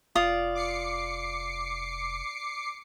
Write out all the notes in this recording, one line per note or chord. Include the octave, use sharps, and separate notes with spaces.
F1 F4 D5 D#6
D6 C7 C#7